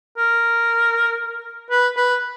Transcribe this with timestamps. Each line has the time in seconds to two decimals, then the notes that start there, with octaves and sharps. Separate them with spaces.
0.17 A#4
1.70 B4
1.97 B4